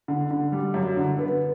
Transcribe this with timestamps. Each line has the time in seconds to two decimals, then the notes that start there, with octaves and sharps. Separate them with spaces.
0.08 D3
0.31 D3
0.52 G3
0.74 F#2
0.97 D3
1.19 B3